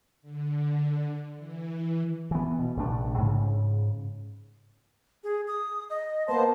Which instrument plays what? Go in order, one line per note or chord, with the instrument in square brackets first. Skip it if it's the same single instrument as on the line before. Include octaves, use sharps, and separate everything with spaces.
[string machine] D3
E3
[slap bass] E3 B3
B2
A#1 C3 A3 D4
G#2 C#3
[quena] G#4
D#6
D#5
[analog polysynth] A#3 B3 C5 [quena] A5